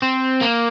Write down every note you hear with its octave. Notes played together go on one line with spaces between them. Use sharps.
C4
A#3